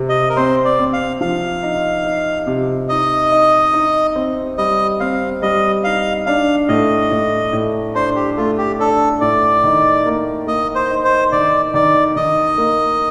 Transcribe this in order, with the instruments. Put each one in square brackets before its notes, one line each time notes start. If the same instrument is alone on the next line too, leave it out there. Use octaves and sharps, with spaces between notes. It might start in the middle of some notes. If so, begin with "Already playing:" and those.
Already playing: [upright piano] C3 C4
[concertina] D#5
A#4
[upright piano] C4 [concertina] C5
[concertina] D5
[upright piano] C4
[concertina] F5
[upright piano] F3 [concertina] F5
[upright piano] D#4
D#4
C3
[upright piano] D#4 [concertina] D#5
[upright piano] D#4
D#4
C4
[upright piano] G3 [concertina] D#5
[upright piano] C4 [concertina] F5
[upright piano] G3 [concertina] D#5
[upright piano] D#4 [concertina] F5
[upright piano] D4 [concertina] F5
[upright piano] A2 [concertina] D#5
[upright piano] A2
A2
[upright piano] D4 [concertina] C5
[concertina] G4
[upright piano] A3 [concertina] F4
[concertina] G4
[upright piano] D4 [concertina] A4
[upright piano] A2 [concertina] D5
[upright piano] D#3
A#3
[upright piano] A#3 [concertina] D#5
[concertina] C5
[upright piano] D#4
[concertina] C5
[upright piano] D#3 [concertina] D5
[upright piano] D#3 [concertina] D5
[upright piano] D#3 [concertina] D#5
[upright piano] A#3